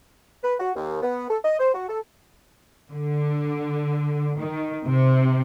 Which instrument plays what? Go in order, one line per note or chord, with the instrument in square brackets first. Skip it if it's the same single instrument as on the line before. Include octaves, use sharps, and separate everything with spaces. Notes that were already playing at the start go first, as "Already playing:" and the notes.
[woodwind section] B4
F#4
D#2
B3
A4
D#5
C5
F#4
A4
[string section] D3
D#3
C3